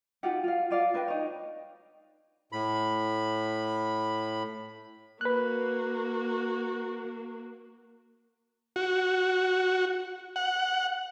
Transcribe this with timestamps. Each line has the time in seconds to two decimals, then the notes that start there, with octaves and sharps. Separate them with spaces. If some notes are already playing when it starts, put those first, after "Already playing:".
0.23 D#4 F4 G4 F#5
0.44 F4 F5
0.71 F4 D5 F5
0.94 D4 B4 D#5 G5
1.08 D#4 C#5
2.52 A2 B5
5.21 A#3 F#4 B4 F#6
8.76 F#4
10.36 F#5